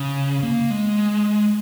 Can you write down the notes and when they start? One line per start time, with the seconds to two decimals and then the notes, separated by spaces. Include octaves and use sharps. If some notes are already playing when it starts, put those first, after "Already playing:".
Already playing: C#3
0.43 A#3
0.70 G#3